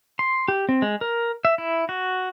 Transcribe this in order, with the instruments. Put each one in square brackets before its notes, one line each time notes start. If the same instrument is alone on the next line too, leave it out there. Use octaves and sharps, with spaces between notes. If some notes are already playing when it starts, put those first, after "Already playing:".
[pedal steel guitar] C6
G4
C4
G#3
A#4
E5
E4
F#4